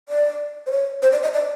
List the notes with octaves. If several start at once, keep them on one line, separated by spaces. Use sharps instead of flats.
D5
C5
C#5
C5
D5
D#5
D5